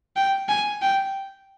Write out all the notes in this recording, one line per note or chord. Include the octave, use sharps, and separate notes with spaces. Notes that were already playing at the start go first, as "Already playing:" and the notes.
G5
G#5
G5